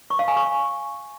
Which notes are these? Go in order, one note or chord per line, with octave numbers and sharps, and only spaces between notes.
C#6
F5
G#5
C#6